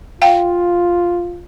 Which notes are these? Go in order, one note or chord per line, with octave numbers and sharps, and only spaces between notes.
F4 F5 G5